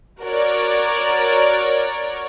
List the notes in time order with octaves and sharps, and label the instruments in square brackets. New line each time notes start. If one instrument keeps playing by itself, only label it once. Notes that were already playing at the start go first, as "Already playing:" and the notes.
[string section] F#4 A#4 C#5 D5